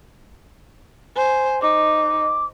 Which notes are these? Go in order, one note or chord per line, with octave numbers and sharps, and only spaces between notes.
C5 G#5
D#4 D6